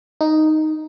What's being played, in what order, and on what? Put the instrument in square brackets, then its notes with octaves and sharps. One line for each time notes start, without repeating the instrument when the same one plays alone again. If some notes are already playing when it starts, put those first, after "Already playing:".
[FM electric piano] D#4